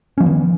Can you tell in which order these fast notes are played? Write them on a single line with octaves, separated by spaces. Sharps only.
C#4 F3 B3 D#3